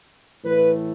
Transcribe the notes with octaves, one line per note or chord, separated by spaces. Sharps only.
A2 E3 A3 B4